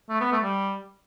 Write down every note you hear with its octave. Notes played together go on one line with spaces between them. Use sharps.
A3
B3
A3
G3